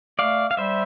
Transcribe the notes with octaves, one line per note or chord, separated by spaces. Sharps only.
A3 D5 F5
F5
G3 C5 E5